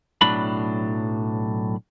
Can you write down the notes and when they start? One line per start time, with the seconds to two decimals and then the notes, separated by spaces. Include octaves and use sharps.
0.21 B1 A2 F#3 D4 B5